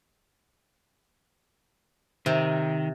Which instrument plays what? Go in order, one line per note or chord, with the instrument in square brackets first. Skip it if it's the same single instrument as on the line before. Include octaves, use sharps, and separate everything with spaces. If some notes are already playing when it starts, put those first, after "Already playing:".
[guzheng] C3 [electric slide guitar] D#3